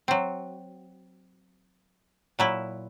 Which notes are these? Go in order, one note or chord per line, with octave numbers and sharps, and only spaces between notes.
F#3 C4
A#2 F#3 E4